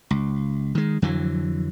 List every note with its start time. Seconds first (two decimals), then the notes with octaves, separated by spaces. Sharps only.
0.11 C#2
0.75 D#3 G#3
1.02 F2 D3 E3 F#3